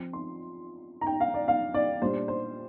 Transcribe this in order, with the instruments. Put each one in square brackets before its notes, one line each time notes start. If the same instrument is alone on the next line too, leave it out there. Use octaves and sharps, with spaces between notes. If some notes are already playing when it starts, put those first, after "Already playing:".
Already playing: [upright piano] F3 C4
C6
A#5
G5
F5
D5
F5
D5
A#2 G3 D4 C5
C5